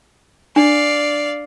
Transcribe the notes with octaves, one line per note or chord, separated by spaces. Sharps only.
D4 D5 F5